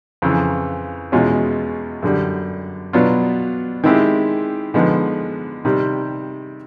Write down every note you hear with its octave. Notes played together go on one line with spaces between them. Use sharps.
F2 C#3 E3
E2 B2 G#3 C#4 F4
F#2 D3 G3
B2 F#3 B3 D4 F4
D#3 G#3 C4 E4 G4
D3 F3 G#3 B3 D#4
C3 D#3 G3